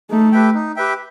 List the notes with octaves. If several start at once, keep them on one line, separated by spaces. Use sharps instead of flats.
A3 D#4
G4 B4 E5 G5
D#4
G4 B4 E5 G5